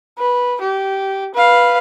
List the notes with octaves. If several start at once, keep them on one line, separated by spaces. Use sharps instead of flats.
B4
G4
B4 F5